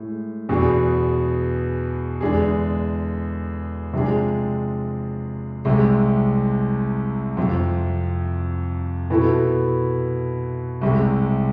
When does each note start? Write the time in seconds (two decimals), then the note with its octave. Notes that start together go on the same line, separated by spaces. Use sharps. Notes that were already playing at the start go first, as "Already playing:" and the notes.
Already playing: A2 G#3
0.49 E2 B2 B3 D4 G#4
2.21 E2 D3 G#3 D4 G#4
3.93 C3 F3 G#3 D4 G#4
5.65 C2 C3 G#3
7.37 F2 C3 F3
9.10 B2 B3 E4 A4
10.81 C2 C3 G#3